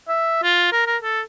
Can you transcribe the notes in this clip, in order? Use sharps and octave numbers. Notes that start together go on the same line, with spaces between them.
E5
F4
A#4
A#4
A4